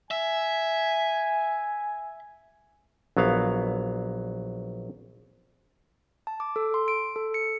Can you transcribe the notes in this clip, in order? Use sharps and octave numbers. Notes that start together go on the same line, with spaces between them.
E5 G#5
A#1 F#3 B3 F5
A5
D6
A4
C6
D7
A4
C#7